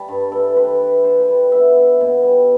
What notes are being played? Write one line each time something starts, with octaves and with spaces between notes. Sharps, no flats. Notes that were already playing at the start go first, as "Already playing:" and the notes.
Already playing: G3 A5 B5
G2
E3 A4
C4 B4
E4
D3 C5
B4
G3
B3 E5
E4
B2
G3